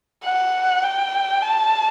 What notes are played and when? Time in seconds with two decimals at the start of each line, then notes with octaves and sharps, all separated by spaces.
0.24 F#5
0.84 G5
1.43 A5